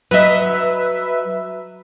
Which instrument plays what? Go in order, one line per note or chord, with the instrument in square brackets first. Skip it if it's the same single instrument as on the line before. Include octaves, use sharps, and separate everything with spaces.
[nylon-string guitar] F#3 D#5 [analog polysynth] B4 E5